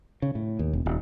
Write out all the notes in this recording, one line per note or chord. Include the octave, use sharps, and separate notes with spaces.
C#3
A2
D#2
E1
D#1